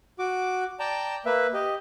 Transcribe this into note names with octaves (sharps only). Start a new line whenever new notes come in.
F#4 D6
D5 G5 A5 A#5
A#3 B4 E5
G4 D#5